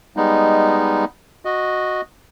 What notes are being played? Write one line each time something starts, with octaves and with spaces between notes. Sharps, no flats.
G3 G#3 B3 D#4
F#4 D#5